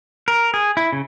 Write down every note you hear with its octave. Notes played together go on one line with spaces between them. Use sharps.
A#4
G#4
E4
C#3